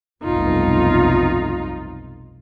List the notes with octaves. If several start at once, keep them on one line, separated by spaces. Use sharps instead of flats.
F1 B1 G2 D#4 F4